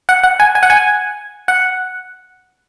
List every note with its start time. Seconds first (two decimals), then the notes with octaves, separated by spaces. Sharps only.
0.09 F#5
0.23 F#5
0.40 G#5
0.55 G#5
0.63 F#5
0.70 G#5
1.48 F#5